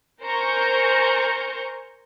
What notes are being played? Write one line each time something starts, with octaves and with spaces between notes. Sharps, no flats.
A#4 C5 G#5 A#5 C#6 G6